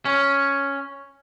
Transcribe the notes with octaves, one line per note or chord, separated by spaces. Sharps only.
C#4